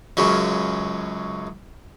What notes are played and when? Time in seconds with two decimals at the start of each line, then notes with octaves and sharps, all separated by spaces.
0.17 C#2 F#2 C#3